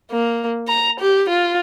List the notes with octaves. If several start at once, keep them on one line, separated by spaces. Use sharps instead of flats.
A#3
A#5
G4
F4